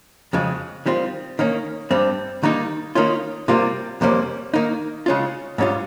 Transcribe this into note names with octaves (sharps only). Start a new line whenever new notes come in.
F2 C#3 G#3
D#3 G3 C4 F4
D#3 A#3 C#4
G2 G3 C4
D#3 G3 A#3 D#4
D#3 A#3 C#4 F4
C3 G3 A#3 F4
F2 C3 G3 A#3 C#4
D#3 A#3 D#4
C#3 G#3 C#4 F4
G#2 G3 C#4 F4